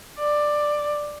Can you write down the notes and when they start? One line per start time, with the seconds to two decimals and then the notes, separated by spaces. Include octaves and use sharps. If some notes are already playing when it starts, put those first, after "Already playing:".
0.19 D5